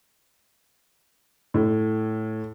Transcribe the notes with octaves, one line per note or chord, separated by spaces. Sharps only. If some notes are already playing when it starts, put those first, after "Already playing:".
A2